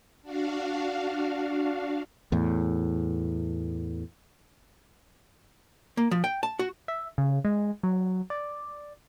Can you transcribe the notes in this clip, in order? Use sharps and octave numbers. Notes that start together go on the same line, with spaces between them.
D4 F#4 F5
E2 A2
A#3
F3
G5
A5
F#4
E5
C#3
G#3
F#3
D5